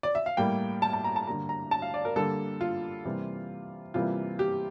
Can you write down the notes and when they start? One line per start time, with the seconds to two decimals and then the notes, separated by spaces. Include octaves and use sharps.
0.03 D5
0.15 E5
0.26 F5
0.37 A2 G3 A#3 G5
0.82 A5
0.93 A5
1.04 A#5
1.16 A5
1.26 D3 G3 A#3 A#5
1.49 A#5
1.71 A5
1.82 F5
1.94 D5
2.05 A#4
2.16 D3 G3 A#3 A4
2.61 F4
3.05 C3 E3 G3 A#3
3.94 C3 E3 G3 A#3 F4
4.39 G4